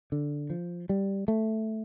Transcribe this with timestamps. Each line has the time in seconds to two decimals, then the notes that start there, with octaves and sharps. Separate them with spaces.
0.12 D3
0.50 F3
0.89 G3
1.28 A3